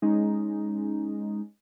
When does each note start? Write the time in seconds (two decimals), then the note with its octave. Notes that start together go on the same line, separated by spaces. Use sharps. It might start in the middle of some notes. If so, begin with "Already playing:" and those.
0.02 G#3 C#4 D#4